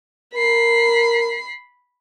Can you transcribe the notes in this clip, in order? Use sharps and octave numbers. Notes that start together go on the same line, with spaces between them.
A#4 B5 C7